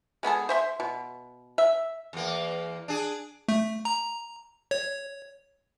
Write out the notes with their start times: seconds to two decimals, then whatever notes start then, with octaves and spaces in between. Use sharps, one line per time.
0.23 G#3 B3 G#4 A4
0.49 C5 E5 C6
0.80 B2
1.58 E5
2.13 E2 A#3
2.88 D4 G#4
3.48 A3
3.85 A#5
4.71 C#5